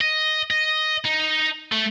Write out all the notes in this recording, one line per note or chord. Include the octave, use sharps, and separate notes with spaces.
D#5
D#5
D#4
A3